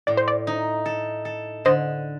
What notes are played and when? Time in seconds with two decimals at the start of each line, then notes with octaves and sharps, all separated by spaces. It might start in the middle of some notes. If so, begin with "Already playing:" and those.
0.07 A2 D5
0.17 C5
0.28 D5
0.47 D#4
0.86 A4
1.25 A4
1.65 D3 C5 D#5